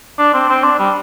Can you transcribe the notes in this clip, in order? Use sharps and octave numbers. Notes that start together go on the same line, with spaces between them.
D4
C4
C4
D4
G3